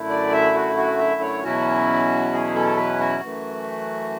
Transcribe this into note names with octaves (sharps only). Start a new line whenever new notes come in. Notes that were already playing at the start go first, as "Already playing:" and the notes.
Already playing: F#2 D3 A3 E4
D5
E5
F#4
F#4
E5
C#5
E2 B2 F#3 C#4 E4 F#4
G#4
A4
B4
F#4
F#2 E3 A3